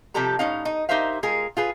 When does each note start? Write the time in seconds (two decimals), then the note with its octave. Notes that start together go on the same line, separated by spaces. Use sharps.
0.14 C3 F3 G3 G4 A4 A#5
0.39 A2 C#4 D#4 F5
0.65 D#4
0.89 D#4 G4 A#4 C5 E5 F5
1.23 G#3 F4 G#4 A#4
1.57 F4 G#4 B4